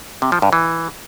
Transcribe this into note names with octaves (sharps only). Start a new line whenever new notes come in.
C3
F3
G2
E3